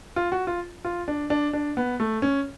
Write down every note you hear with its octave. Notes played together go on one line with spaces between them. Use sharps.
F4
F#4
F4
F4
D4
D4
D4
B3
A3
C#4